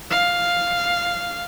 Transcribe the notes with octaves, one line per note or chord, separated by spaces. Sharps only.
F5